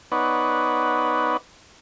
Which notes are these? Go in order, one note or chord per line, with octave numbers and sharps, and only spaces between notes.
B3 D#4 B4 C#5 D5 F#5